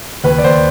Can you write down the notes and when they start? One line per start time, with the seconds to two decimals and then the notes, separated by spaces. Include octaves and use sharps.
0.24 D#2 B4
0.38 D5
0.44 D#2 C5